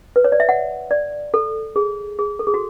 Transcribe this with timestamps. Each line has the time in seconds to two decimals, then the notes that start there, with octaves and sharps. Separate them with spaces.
0.16 B4
0.24 C#5
0.32 D5
0.40 E5
0.49 F#5
0.91 D5
1.34 A4
1.76 G#4
2.19 G#4
2.39 A4
2.47 G#4
2.54 F#4